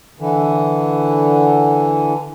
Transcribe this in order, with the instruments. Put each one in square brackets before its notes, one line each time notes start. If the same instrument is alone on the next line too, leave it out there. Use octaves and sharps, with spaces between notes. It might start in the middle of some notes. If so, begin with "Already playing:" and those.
[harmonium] D3 E3